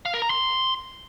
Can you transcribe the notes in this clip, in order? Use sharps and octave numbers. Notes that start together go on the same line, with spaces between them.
F5
A#4
A#5
C6